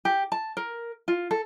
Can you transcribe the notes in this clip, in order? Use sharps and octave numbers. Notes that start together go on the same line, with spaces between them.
G4
A5
A#4
F4
A4